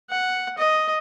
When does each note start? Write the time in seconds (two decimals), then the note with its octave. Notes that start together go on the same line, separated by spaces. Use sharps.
0.10 F#5
0.58 D#5